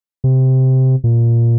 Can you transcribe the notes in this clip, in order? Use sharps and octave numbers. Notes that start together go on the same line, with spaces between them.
C3
A#2